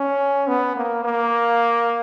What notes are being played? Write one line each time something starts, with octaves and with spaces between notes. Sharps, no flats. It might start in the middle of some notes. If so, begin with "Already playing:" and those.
Already playing: C#4
B3
A#3
A#3